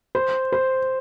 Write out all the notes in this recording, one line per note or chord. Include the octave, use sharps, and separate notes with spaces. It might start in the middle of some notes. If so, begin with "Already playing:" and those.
C5
C5